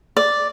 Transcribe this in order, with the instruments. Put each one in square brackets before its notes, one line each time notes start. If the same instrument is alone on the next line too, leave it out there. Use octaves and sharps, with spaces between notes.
[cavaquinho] D5